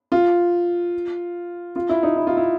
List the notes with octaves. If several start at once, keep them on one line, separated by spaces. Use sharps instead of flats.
F4
F4
E4
D#4
E4
F4
E4